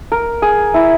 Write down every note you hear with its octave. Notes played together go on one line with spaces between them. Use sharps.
A#4
G#4
E4